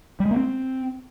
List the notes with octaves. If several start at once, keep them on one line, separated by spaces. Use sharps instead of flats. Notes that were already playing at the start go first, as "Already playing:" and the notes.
G3
G#3
A#3
C4